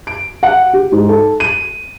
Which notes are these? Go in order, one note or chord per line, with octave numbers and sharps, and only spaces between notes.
D7
F#5
G4
G#2
A4
D#7